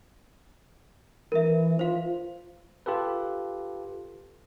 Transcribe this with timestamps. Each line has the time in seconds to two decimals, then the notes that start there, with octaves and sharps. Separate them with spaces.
1.32 E3 A#4 E5
1.79 F4 C5 F5
2.86 F4 G4 A4 B4